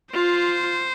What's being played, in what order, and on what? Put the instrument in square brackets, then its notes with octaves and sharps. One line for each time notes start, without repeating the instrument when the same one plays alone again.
[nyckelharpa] F4 [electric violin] C5